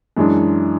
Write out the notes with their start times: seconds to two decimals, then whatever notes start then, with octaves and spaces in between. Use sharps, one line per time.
0.17 F#2 E3 G#3 D4